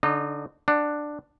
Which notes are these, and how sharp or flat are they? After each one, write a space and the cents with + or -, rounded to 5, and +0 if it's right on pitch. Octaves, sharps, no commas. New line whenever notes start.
D3 -15 D#4 -35 D#5 -5
D4 +10 F#5 +0